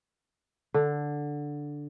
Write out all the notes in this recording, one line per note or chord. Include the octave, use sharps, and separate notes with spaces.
D3